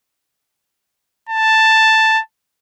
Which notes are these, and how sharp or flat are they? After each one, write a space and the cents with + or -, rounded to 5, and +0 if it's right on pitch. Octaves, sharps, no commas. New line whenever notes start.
A5 +5